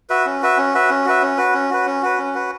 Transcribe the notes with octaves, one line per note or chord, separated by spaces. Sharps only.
F#4 B4 E5
C#4
F#4 B4 E5
C#4
F#4 B4 E5
C#4
F#4 B4 E5
C#4
F#4 B4
C#4
F#4 B4
C#4
F#4 B4
C#4
F#4 B4